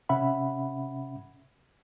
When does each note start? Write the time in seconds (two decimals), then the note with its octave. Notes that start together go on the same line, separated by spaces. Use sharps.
0.09 C3 C#4 E5 F#5 B5